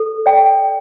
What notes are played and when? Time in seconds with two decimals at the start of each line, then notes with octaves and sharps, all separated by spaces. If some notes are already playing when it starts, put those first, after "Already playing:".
Already playing: A4
0.26 D5 G5